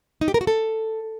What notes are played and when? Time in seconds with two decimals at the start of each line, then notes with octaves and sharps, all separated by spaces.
0.21 D#4
0.28 G4
0.34 A#4
0.41 F#4
0.47 A4